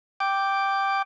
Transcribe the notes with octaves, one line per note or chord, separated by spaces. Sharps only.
G5 D6